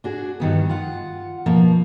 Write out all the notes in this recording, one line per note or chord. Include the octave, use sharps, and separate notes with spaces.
D4 F#4 G#4
G2 D#3 B3
F4 F#5
B2 F3 A#3